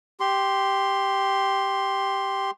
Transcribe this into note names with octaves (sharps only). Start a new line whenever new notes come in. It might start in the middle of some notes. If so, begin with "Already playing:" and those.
G4 C6